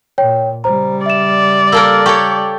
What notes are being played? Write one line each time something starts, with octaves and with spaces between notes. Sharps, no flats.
A#2 C#5 G5
C#3 G3 C5 A#5
D5 E5 E7
A#3 A4 A#4 E6
G4 A4 C#5 C#6